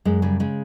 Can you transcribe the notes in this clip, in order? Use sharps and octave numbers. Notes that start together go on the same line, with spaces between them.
F#2 G#3
C#3 G3
C#3 G#3